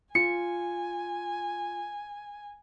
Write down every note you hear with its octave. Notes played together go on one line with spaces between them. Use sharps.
F4 G#5 C#7